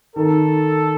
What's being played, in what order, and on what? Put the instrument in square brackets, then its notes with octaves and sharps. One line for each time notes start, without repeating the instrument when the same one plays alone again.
[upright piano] D#3 [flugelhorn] A4